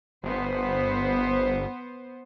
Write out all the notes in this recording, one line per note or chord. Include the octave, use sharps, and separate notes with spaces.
G1 B3 C5